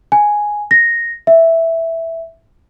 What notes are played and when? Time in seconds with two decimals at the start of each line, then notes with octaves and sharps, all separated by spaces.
0.12 G#5
0.71 A#6
1.27 E5